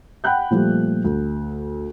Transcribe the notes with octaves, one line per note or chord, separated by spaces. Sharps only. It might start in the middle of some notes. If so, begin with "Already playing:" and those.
F#5 G5 B5 F#6 G6
A#2 F3 G3 A3
D2